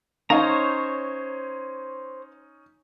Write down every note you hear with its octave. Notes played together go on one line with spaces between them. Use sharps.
C#4 D#4 C5 C#5 F5 A5 A#5